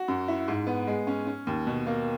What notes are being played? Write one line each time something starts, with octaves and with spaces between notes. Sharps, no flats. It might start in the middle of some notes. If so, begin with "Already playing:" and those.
Already playing: F#4
F#2
E4
G#2
B3
G#3
C#4
C#4
D#2
B2
A#3